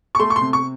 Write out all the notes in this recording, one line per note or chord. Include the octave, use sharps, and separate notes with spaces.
C#6
A3 C6
C#6
C6
C3
C#6